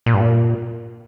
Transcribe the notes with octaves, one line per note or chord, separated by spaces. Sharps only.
A#2
G2
A#2